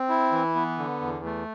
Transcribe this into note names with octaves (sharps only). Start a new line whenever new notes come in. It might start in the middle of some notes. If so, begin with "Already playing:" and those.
Already playing: C4
E4
E3
B3
D3
E2
A3